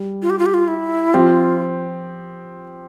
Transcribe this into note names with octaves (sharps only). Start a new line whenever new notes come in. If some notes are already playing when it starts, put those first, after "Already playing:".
Already playing: G3
F4
G4
F4
G4
F4
E4
F3 C4 F4 G4